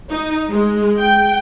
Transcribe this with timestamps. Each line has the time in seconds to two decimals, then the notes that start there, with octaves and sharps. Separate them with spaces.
0.11 D#4
0.50 G#3
1.00 G5